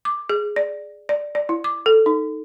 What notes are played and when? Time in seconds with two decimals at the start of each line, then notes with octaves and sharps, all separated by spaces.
0.05 D6
0.30 G#4
0.56 D5
1.09 D5
1.35 D5
1.49 E4
1.64 D6
1.86 A4
2.06 D#4